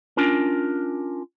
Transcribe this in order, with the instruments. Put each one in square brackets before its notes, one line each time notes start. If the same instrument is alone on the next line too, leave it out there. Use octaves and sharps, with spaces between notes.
[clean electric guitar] C#4 D4 F4 A#4